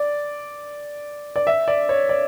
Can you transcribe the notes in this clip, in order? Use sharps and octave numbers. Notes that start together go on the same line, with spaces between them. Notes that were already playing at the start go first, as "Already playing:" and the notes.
Already playing: D5
D5
E5
D5
C#5
D5